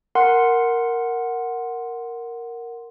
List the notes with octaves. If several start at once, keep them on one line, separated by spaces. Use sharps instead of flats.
A#4 F#5 C6